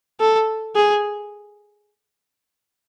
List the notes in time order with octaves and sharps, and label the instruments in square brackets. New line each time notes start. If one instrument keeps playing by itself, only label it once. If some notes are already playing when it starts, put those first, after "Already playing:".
[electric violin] A4
G#4